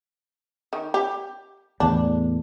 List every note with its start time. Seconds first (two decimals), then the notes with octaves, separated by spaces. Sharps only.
0.73 D#3
0.94 G4
1.80 E2 A2 D4